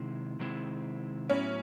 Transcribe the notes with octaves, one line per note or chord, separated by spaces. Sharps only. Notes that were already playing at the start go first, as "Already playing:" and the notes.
Already playing: C3 D#3 G#3 C4 E4
C3 D#3 G#3 C4 E4
A2 F#3 B3 C#4 E4